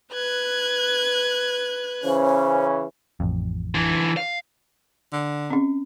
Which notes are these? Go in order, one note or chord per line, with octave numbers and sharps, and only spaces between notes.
B4 F#6 G#6
C#3 E3 C#4 C5
A1 F2
D3 E3
F5
D3
C4 C#4